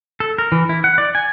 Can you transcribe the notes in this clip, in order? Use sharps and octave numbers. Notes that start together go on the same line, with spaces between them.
A4
A#4
E3
E4
F#5
D5
G#5